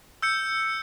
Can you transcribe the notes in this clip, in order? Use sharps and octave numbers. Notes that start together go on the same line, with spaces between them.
E6 G6 C#7